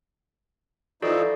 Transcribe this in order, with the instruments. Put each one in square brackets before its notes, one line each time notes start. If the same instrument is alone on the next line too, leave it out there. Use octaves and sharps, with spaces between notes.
[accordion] E3 F3 D#4 [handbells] F#4 A4 D5